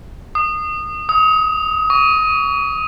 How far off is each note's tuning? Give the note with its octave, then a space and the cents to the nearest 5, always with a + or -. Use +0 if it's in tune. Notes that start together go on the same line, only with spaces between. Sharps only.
D#6 -20
D#6 +30
C#6 +35